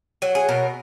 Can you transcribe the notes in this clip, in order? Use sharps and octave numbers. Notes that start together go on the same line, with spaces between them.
F#3 F#4
G#4
B2 A#4